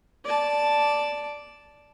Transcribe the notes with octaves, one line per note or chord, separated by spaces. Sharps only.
D5 A5